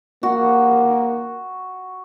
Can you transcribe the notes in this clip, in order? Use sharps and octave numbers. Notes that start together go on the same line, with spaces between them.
A#3 F#4